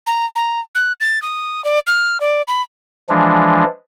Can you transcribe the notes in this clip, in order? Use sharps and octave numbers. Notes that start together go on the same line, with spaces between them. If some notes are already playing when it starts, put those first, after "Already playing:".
A#5
A#5
F#6
A6
D#6
D5
F6
D5
B5
E3 F3 G#3 D4